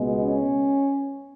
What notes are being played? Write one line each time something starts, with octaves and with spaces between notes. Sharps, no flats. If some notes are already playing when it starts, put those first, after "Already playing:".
Already playing: C#2 B2 G#3 B3
C#4